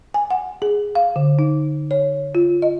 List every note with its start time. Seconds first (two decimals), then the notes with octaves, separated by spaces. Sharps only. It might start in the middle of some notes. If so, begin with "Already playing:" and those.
0.14 G#5
0.31 F#5
0.62 G#4
0.95 F5
1.16 D3
1.39 D#4
1.91 C#5
2.35 F4
2.62 D#5